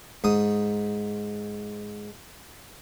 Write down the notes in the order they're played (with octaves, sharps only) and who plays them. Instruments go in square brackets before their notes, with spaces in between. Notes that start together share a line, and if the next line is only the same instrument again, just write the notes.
[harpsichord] G#2 D#6